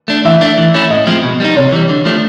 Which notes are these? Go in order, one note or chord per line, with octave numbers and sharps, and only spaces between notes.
A3 D4
E3 E5
A3 D4
E3
A3 C#4 E4
A2 D#5
F3 G#3 C4
B2
G3 B3 D#4
C3 C#5
E3 G3
D3
F3 A3 D4